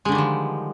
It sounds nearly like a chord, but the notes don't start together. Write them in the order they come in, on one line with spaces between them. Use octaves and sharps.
G#3 D3 D#3 G3 F3